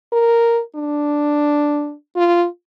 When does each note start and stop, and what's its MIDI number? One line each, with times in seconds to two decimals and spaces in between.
0.12 0.61 70
0.76 1.94 62
2.16 2.46 65